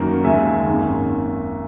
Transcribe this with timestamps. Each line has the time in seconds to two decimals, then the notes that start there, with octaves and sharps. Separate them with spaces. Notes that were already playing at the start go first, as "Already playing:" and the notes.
Already playing: F#2 D#3 F#3 A#3
0.24 D#2 D#3 G#3 E5 G#5
0.67 G#1 F#2 D#3 A#3